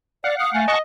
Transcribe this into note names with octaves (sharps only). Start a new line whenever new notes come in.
D5 F5 F#5
D#6
A3 G#5
D#5 F#5 A5 C#6